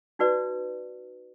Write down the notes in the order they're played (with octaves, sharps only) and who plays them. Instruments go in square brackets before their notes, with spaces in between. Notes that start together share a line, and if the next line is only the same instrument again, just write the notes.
[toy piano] D#4 F#4 B4 D5